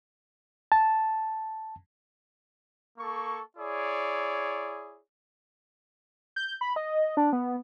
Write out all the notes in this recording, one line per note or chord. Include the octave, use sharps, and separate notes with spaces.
A5
A#3 A4 C#6
E4 G#4 C#5 D5
G6
B5
D#5
D4
B3